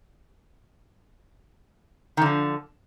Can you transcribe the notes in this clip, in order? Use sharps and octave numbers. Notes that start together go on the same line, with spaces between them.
D3 D#3 F3